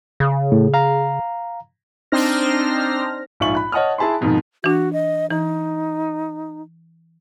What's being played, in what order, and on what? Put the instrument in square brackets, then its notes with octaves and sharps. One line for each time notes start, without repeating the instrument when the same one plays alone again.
[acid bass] C#3
[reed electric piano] A2
F5 A#5
[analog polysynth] C4 D4 D#4 C5 F6 A#6
[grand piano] A#1 G#2 F4 E5 C#6 F#7
B5 F#6
C#5 D#5 F#5 A5 D#6 F6
E4 G#4 A5 B5 C6
F2 G#2 B2 D#3 F3
[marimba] E3 D4 [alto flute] F#4
[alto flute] D#5
[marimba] E3 [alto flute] D#4